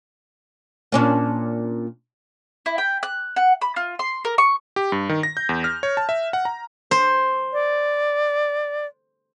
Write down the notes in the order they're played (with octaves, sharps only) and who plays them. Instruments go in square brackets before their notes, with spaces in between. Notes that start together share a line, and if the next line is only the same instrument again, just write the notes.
[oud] A#2 C#4 D4
[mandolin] E4
G5
F#6
F#5
B5
F4
C6
A#4
C#6
[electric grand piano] G4
G2
D#3
A#6
G6
E2
F6
C#5
A5
E5
F#5
A#5
[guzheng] C5
[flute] D5